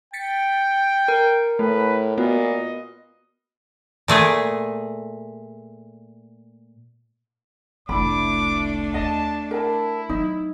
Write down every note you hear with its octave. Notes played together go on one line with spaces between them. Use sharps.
G5 A6 B6 C#7
A#4
A2 A3 B4
A#2 B3 F#4 D#5
A#2 A3 G#4
F1 C2 A3 D4 E4 B5 D6
D#2 D#5 A5
E4 A#4 A5
F#3 D#4